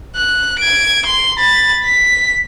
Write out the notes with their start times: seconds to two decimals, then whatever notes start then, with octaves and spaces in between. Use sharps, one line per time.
0.16 F#6
0.59 G#6 D7
1.05 C6
1.39 B5 A6
1.85 B6